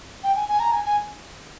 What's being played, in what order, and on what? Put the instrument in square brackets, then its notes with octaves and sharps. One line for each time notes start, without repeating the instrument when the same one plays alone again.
[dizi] G5
G#5
G#5
A#5
G#5
G#5